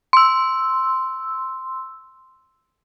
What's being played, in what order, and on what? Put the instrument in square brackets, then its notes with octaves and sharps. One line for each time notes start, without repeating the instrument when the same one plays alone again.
[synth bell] C6 E6